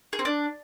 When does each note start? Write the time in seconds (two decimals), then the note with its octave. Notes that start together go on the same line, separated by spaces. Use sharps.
0.13 G#4
0.19 C4
0.25 D4